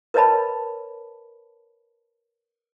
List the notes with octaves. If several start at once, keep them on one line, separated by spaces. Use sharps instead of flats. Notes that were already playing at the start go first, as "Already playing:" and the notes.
A#4 B4 C#5 D#5 A5 B5